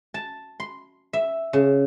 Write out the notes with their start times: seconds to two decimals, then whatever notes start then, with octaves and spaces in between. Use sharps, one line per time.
0.14 A5
0.60 C6
1.13 E5
1.53 C#3